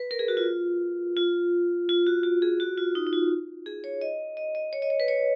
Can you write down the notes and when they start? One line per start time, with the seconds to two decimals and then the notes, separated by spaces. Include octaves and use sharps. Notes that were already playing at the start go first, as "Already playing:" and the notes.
Already playing: B4
0.11 A#4
0.19 G#4
0.28 F#4
0.37 F4
1.17 F4
1.89 F4
2.06 F#4
2.23 F#4
2.42 G#4
2.60 F#4
2.78 F4
2.95 D#4
3.07 D#4
3.13 F4
3.66 G#4
3.84 C#5
4.01 D#5
4.37 D#5
4.55 D#5
4.73 C#5
4.82 D#5
4.90 C#5
5.00 B4
5.08 C#5